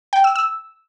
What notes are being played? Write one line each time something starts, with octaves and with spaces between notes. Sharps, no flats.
G5
E6
E6